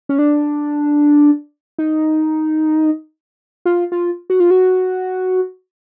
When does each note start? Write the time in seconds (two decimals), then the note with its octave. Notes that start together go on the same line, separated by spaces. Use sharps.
0.09 C#4
0.19 D4
1.78 D#4
3.65 F4
3.92 F4
4.30 F#4
4.40 F4
4.51 F#4